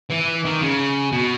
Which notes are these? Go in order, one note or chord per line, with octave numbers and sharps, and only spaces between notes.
E3
D#3
C#3
B2